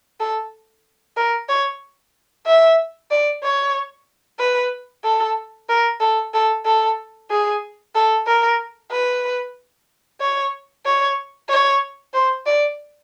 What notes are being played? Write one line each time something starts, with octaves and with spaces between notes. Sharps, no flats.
A4
A#4
C#5
E5
D5
C#5
B4
A4
A#4
A4
A4
A4
G#4
A4
A#4
B4
C#5
C#5
C#5
C5
D5